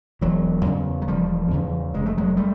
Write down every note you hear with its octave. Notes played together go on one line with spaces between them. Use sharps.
E1 E3 F#3
E2 C#3
F#3
E1 F3 G3
E2 C#3
F1 G#3
A3
F#3 G#3
G3 A3